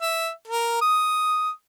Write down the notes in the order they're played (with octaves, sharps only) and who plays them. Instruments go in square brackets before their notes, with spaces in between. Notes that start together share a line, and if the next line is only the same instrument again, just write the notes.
[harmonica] E5
A#4
D#6